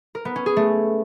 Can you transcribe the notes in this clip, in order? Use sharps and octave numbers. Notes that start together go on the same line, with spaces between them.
A#4
B3
C#4
G#4
A3